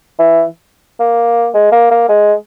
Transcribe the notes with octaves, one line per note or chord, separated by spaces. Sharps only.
E3
A#3
G#3
A#3
A#3
G#3